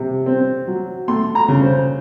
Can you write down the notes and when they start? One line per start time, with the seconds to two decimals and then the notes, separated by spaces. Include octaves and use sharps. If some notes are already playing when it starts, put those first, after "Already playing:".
Already playing: C3
0.26 C4
0.67 F#3
1.08 A3 C6
1.35 A#5
1.48 C#3
1.62 C5